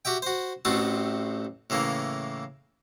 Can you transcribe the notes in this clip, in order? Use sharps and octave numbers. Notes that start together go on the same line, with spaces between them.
F#4 G4 E5 G5
F#4 C5
A1 A2 A3 C4 F#4 A5
A2 C#3 E3 A#3